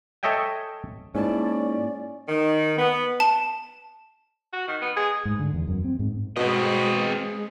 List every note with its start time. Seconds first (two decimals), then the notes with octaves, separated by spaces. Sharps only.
0.23 A4 C#5 D#5 E5 G5 G#5
1.15 G#2 A#3 C#4 E4 D5 A5
2.29 D#3
2.77 B3
3.20 A5
4.53 F#4
4.68 D#3
4.82 B3
4.97 G#4
5.25 G#2
5.39 D3
5.54 E2
5.68 F#2
5.84 C4
5.99 G#2
6.36 B2 G#3 C4 G#4 D#5